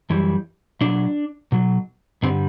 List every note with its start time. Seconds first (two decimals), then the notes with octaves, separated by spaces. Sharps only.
0.10 F#2 E3 G3
0.81 B2 F#3 D4
1.52 B2 F#3
2.23 G2 D3 G3 C4